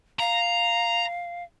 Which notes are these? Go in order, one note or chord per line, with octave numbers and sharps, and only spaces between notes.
F5 A#5